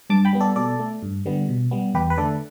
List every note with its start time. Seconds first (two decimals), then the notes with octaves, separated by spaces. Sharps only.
0.10 G2 A5 D6
0.25 G5 B5
0.33 G3 B3
0.40 A4 D5
0.56 B2 A4 D5
0.79 A3
1.02 G2
1.26 D3 G3 B3
1.49 B2
1.71 G3 B3
1.94 E2 G4 B4
2.10 B4
2.17 D3 A3 A4 D5